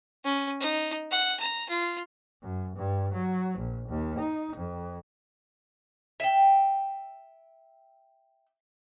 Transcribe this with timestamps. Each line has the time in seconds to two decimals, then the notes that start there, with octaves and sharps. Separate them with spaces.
0.25 C#4
0.60 D#4
1.11 F#5
1.40 A#5
1.69 F4
2.43 F#2
2.76 G2
3.14 F#3
3.59 A#1
3.90 D#2
4.20 D#4
4.57 F2
6.20 E5 G5